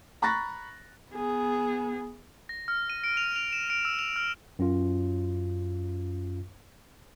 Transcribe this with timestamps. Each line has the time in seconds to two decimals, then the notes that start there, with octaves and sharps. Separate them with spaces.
0.22 A#5 B5 C#6 F#6 A6 A#6
1.11 B3 G#4
2.49 A#6
2.68 F6
2.90 D#7
3.04 D7
3.17 F7
3.36 F7
3.53 E7
3.70 D7
3.85 E6
3.99 F7
4.16 F6
4.59 F#2 C#4 F4